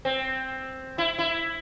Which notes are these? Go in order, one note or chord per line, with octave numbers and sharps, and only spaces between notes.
C4
E4
E4